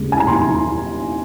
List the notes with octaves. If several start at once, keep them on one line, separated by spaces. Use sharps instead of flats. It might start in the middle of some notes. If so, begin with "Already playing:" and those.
Already playing: D#2 C#3 G#3
G#5
A#5
D#2 C6